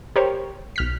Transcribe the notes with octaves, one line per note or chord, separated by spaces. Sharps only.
G4 A#4 C5 C#5
B1 F6 B6